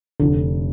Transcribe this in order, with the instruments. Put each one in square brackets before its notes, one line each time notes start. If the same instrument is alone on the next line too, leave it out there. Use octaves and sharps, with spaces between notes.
[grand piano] F1 [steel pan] D3